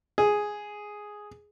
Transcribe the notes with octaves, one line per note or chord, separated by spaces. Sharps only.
G#4